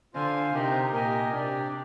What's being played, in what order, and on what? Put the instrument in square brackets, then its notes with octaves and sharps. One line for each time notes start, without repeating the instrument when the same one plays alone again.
[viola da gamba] D3 [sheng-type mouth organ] F4 C5 F5 G#5
[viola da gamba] C3 [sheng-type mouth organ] D#4 G4 A#4
[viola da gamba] A#2 [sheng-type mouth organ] G4 A#4 D#5 G#5
[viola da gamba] C3 [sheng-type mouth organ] D4 G4 D5